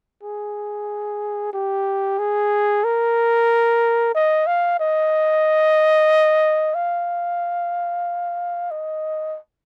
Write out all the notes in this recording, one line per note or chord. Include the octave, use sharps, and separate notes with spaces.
G#4
G4
G#4
A#4
D#5
F5
D#5
F5
D#5